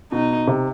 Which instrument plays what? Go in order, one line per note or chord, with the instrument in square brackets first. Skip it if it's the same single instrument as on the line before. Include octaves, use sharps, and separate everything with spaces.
[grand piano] B2 [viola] D#4
[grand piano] C3